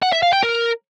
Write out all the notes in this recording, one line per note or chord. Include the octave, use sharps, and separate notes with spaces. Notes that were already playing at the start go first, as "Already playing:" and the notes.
F#5
E5
F5
G5
A#4